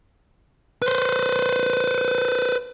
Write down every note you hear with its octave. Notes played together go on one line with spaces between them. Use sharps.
B4 C5